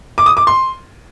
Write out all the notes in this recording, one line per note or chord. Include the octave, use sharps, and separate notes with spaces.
D6
D#6
D6
C6